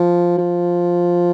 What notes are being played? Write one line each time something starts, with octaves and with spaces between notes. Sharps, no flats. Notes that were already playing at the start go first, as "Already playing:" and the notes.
Already playing: F3
F3